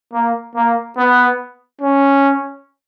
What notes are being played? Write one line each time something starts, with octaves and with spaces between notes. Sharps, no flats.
A#3
A#3
B3
C#4